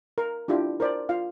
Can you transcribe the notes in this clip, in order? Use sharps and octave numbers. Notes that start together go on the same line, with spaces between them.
A#4
D4 E4 F4 G4
A#4 C5 D5
F4 F5